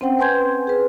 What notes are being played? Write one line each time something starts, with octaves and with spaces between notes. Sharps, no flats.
C4 C#4 C5 F#5 G5
B4 G#5 C6 G6 G#6
G#4 B4